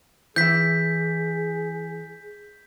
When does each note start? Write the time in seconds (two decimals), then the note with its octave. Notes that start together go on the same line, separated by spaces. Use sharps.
0.36 E3 E4 G#4 G6 B6